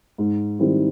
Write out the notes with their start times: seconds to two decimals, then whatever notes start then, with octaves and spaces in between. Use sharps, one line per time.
0.18 G#2
0.59 D#3 G3 C4 E4